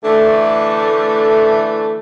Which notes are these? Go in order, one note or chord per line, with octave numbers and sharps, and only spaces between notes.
D3 E3 A3